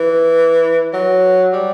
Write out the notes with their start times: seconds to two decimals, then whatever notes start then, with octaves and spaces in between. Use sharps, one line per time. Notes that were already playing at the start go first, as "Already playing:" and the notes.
Already playing: E3
0.93 F#3
1.53 G3